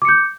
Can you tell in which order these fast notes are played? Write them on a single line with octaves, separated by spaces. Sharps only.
D6 C#7 G6